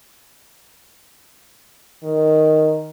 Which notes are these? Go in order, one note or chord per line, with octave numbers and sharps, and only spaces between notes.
D#3